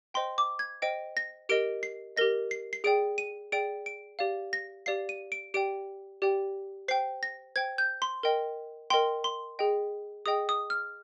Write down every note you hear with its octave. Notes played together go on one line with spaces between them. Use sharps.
C5 D#5 G5 C6
D6
G#6
C5 D#5 G5 D7
A#6
G4 A#4 D#5 D7
C7
G4 A#4 D#5 A#6
C7
C7
G#4 D5 G5 D7
D#7
G#4 D5 G5 D7
D7
G4 D5 F5
A#6
G4 D5 F5 C7
D#7
D7
G4 D5 G5 D7
G4 D5 G5
C5 G5 C7
A#6
C5 G5 G#6
G6
C6
A#4 D#5 G5
A#4 D#5 G5 C6
C6
G#4 D#5 G5
G#4 D#5 G5 D#6
D#6
F6